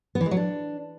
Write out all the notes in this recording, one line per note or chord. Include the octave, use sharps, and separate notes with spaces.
B3
E3
G#3
F#3
D4